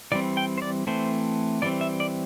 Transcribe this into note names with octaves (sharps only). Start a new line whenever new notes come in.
E3 G3 C4 D5
G5
C5
D5
E3 A3 C4 C5
E3 G3 C4 D5
E5
D5